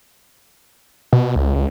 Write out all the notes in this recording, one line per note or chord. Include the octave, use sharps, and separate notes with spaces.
B2
C#2
C#2